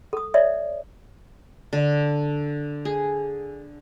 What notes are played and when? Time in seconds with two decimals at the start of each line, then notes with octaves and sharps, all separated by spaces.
0.13 A4 D#6
0.34 C#5 D5 E5
1.73 D3
2.85 G#4